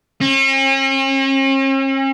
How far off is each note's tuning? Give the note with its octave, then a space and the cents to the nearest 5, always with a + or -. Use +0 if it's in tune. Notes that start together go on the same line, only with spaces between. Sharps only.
C#4 -45